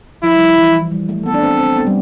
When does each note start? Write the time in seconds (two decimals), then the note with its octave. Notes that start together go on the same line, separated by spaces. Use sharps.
0.23 F3 E4
0.36 G3
0.41 F3
0.58 E3
0.74 E3
0.92 G3
1.09 A3
1.26 B3 A4
1.34 D4
1.42 C4
1.59 C4
1.76 B3
1.87 G3